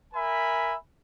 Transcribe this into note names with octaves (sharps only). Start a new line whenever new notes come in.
A#4 E5 G#5 B5